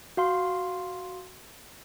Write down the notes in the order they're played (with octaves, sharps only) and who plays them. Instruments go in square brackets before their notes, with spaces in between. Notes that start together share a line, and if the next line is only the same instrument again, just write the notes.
[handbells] F#4 F5 C6